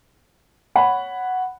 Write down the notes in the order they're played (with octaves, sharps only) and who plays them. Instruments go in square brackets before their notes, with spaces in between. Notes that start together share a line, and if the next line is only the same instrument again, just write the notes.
[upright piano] C#5 F#5 B5